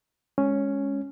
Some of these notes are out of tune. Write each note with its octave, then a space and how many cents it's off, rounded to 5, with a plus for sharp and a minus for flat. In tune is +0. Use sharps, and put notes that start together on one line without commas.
G#3 +0 C#4 +0